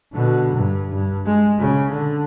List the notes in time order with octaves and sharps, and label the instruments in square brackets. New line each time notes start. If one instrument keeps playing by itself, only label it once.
[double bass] B2 D3
G2
G2
G#3
C#3
D3